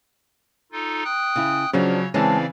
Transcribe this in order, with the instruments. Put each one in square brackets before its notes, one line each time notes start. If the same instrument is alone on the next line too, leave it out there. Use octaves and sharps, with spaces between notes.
[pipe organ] D#4 F4 A4
G5 D#6 F#6
[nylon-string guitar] C#3 E4
[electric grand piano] C#3 F#3 [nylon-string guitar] F3 C#4 D4 [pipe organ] C#5
[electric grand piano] C#3 E3 C4 [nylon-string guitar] G#3 C#5 A5 [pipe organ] D5 F5